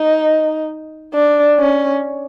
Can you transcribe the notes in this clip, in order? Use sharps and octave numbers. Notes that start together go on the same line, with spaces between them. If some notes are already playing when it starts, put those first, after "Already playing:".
Already playing: D#4
D4
C#4